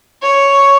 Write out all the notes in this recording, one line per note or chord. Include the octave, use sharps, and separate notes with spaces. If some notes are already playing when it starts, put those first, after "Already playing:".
C#5